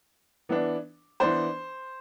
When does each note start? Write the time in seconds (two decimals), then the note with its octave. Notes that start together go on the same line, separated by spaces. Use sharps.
0.49 E3 B3 D4
1.20 E3 B3 D4 C5